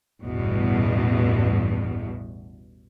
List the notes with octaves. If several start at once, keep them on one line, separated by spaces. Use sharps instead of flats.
A1 E2 G2 B2